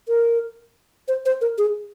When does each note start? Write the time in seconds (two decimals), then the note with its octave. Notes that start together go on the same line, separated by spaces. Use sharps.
0.08 A#4
1.08 C5
1.26 C5
1.41 A#4
1.58 G#4